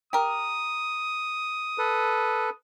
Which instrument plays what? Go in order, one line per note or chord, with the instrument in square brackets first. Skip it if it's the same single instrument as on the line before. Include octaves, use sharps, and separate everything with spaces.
[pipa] G4 A#4 [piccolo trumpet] D#6
[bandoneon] A4 B4